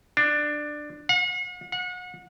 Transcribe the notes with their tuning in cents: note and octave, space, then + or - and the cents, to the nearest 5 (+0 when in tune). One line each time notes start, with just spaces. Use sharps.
D4 +15
F#5 -45
F#5 -35